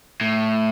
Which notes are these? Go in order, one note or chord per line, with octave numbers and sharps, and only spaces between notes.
A2